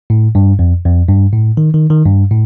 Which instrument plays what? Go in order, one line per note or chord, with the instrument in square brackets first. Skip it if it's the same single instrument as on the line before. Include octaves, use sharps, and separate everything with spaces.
[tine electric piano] A2
G2
F2
F2
G2
A2
D#3
D#3
D#3
G2
A2